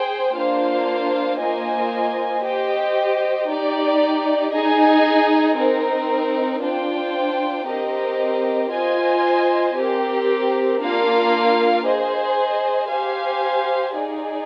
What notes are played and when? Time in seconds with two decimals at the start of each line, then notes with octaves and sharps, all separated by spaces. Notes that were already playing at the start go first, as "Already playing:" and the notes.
Already playing: G#4 C5 G5
0.34 A#3 D4 F4 C5 F5
1.39 A#3 F4 C5 D#5 G#5
2.43 G4 C5 D#5 G5
3.49 D#4 G4 D5
4.53 D#4 G#4 D#5 G#5
5.57 C4 D#4 A#4
6.61 D4 F4 C5 G5
7.66 C4 G4 A#4 D#5
8.70 F4 C5 D#5 G#5
9.75 C4 G4 A#4
10.80 A#3 D4 F4 A#4 F5
11.85 G#4 C5 D#5
12.88 G4 C5 F5 G#5
13.94 D#4 G#4 D5